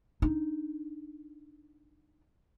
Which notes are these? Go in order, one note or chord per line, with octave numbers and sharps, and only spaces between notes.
D4 D#4